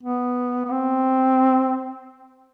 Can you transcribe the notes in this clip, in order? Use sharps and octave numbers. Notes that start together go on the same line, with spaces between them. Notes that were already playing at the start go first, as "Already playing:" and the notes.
B3
B3
C4